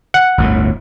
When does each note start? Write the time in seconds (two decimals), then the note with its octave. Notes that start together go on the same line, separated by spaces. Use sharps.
0.14 F#5
0.38 G1 D2 A2